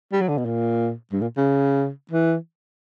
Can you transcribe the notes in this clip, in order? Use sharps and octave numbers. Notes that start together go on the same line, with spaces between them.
G3
F#3
D3
B2
A#2
G2
A#2
C#3
E3